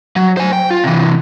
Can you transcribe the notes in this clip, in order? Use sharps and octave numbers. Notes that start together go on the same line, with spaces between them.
F#3
C5 G#5
G5
F4
C3 E3